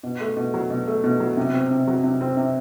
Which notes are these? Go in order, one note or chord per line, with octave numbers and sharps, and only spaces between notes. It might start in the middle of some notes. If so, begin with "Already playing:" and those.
B2
A3
B2
F#3
B2
A3
B2
F#3
C3
C4
C3
F#3
C3
C4
C3